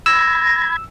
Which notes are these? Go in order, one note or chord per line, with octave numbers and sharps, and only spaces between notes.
B5 E6 G#6 A#6